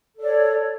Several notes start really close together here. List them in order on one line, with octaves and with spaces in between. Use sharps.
A4 D5 C#5